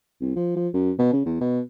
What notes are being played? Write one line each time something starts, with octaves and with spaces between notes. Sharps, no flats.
C2
F3
F3
F#2
B2
C#3
E2
B2